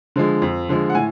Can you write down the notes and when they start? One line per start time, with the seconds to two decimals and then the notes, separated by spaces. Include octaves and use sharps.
0.16 D3 F3 G#3
0.42 F2
0.69 D3 F3 G#3
0.90 F#5
0.95 A2 G#5